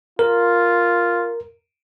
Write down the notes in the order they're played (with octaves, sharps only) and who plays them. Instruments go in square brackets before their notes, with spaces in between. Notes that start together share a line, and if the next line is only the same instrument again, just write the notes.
[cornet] F4 [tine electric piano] A#4